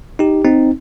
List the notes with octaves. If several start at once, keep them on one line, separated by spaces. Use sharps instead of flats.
D#4 G4
C4 D#4